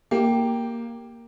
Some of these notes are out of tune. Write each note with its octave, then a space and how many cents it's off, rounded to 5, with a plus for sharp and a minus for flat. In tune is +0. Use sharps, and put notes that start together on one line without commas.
A#3 +0 G4 +0